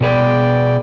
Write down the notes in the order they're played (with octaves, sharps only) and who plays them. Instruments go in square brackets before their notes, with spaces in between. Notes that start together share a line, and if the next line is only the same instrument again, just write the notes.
[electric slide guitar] B2 G#4 B4 [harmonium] D5 G5